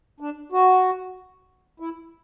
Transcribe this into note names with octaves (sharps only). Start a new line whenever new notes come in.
D4
F#4
E4